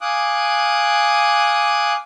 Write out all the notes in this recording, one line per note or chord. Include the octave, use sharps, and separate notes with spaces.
F5 G#5 D6 D#6 F#6